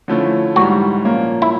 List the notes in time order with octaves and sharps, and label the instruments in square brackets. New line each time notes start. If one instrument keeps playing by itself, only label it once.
[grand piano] D3 F3 A3 C#4 E4
[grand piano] G#2 E3 G3 [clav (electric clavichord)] F#4
[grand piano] A#2 F3 A#3 C#4
[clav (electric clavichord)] E4